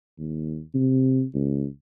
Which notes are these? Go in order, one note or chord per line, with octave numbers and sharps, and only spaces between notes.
D#2
C3
C#2